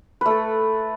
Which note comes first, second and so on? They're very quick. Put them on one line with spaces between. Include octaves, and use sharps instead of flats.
B4 A3 A4